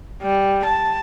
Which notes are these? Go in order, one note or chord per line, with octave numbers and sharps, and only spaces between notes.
G3
A5